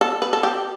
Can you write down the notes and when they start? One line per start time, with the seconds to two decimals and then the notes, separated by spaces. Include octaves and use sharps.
0.01 A4
0.22 B4
0.33 A4
0.43 G4